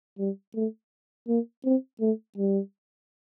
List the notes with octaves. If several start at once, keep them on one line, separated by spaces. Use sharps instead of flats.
G3
A3
A#3
C4
A3
G3